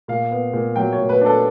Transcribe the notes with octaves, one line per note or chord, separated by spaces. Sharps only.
A#2 F5
B3
A#2
F#3 G5
C#5
A#2
B4
D4 A4